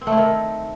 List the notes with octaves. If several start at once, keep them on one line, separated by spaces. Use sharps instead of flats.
C4
A3
E4
D#3